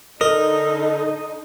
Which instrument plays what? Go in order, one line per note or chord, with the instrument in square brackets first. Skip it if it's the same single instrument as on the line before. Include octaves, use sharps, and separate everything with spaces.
[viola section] D3 D#4 [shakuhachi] A4 [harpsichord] A#4 [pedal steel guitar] D#5